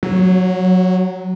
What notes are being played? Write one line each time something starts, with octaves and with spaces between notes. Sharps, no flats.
F#3